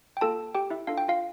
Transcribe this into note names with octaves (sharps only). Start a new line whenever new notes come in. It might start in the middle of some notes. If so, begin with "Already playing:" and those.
G5
A#3 F4 A4 A5
G4 G5
E4 E5
D4 F4 A4 F5
G5
F4 F5